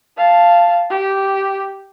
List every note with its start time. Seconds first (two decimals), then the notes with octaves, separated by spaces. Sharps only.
0.17 F5 A5
0.90 G4